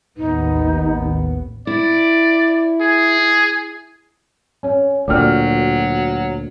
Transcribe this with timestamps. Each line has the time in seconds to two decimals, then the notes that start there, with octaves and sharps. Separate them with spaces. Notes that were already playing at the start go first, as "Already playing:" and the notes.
0.18 A1 D#2 B3 D#4
1.67 E4 D5
2.80 G#4
4.63 C#4 C#5
5.08 D2 A#2 F#3 D5 G5 F6